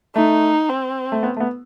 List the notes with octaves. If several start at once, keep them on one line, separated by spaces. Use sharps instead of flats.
A3 D#4
C4
A3
B3
A3
B3